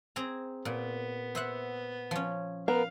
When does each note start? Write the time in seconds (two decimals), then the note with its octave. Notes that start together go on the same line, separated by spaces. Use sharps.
0.16 C4 G#4 A#5
0.65 A#2 B3
1.35 C5 E5 F#5
2.11 F3 C#4
2.68 B3 A#4 F5